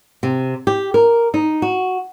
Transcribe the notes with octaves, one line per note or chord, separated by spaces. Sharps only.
C3
G4
A#4
D#4
F#4